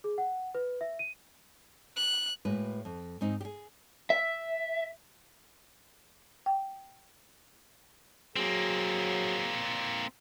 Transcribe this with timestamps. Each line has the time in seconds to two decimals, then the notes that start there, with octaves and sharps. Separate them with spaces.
0.04 G#4
0.18 F#5
0.55 B4
0.81 E5
0.99 D#7
1.96 F#6
2.45 A2 G#3 A#3 F#4 B4
2.85 F2
3.21 G#2 C4 D#4
3.41 G4 G#4
4.10 E5
6.46 G5
8.36 F#3 A#3 C4 G#4